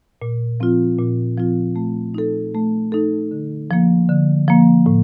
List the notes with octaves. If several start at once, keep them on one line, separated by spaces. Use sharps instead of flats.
A#2
F3 C4 F4
A#2
F3 C4 F4
A3
D#4 A4
A3
D#4 A4
D3
F3 A#3
D3
F3 A#3
A2